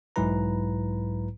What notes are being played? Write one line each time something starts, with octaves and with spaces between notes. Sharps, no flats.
B1 G#2 F#3 E4 B4 A#5